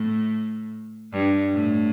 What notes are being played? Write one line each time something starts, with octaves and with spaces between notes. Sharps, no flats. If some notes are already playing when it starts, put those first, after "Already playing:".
Already playing: A2
G2
A2